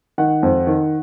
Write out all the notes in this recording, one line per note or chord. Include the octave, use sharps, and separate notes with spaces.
D#3 F#5
F2
D#3